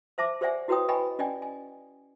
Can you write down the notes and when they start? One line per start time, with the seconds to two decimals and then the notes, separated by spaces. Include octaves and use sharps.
0.18 C5 E5 A5 D6
0.41 G4 C5 D5 E5 F#5 G#5
0.68 E4 F#4 B4 C#5 G5 D#6
0.89 B4 D#5 G5 G#5 B5 C#6
1.19 C#4 D5 D#5 G5 G#5
1.42 G#5